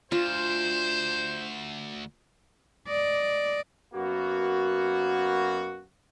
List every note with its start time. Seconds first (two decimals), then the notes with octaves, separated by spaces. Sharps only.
0.12 D2 F4 C5 E7
2.88 D5 D#5
3.94 F#2 A#3 B3 F#4